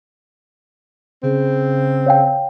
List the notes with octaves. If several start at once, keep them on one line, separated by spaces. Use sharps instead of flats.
C#3 C4
C#5 F5 G5